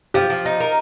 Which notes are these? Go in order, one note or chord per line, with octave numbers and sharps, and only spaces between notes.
F3 G4
F3
D#4
A#4